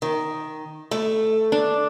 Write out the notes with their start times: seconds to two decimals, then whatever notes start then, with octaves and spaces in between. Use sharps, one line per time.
0.02 D#3
0.91 A3
1.52 D4